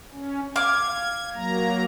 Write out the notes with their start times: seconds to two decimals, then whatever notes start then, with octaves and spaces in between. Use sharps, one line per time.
0.12 C#4
0.56 F5 D6 G#6
1.35 F#3 A#3 A#5